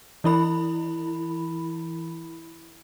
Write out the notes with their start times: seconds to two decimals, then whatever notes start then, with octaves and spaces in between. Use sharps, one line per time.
0.24 E3 E4 B5